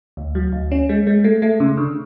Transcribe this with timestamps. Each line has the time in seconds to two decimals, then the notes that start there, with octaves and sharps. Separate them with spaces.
0.17 D2
0.35 F#3
0.52 D2
0.71 C#4
0.89 G#3
1.07 G#3
1.24 A3
1.42 A3
1.60 C#3
1.77 D3